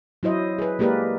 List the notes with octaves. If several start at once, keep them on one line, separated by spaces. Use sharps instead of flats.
F#3 E4 C5 D#5
G#4 B4
G#3 A#3 G4 A#4 B4 D5